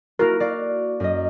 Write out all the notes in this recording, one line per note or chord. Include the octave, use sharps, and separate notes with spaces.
A#3 E4 F#4 A#4
F#4 D5 F5
F#2 D#5